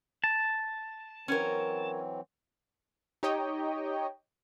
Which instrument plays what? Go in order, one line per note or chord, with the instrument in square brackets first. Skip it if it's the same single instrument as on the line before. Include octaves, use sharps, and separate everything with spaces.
[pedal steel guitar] A5
[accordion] E3 F#3 C4 [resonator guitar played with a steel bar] C#4 A#4
[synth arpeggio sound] D#4 G4 C#5 D#5 G5